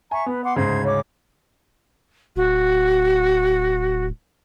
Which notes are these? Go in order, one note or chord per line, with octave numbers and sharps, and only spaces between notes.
E5 G#5 A#5 C#6
B3 B4
F#5 C6 D6
D2 G#2 C#3 C5 G#6
C#4 C#5 D6
D1 F#4